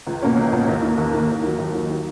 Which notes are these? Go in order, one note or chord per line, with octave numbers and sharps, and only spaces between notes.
C#2
B2 A#3 C#4
C#2
B2 A#3 C#4
D#2
D#3 A#3
D#2
D#3 A#3
D#2
D#3 F#3
D#2
D#3 F#3
D#3